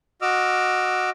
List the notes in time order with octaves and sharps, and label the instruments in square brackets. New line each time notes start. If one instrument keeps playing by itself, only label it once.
[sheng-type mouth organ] F#4 D#5 D6 E6 F6